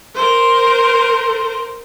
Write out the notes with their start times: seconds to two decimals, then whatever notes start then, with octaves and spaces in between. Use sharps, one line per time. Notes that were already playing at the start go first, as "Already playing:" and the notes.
0.15 A#4 C5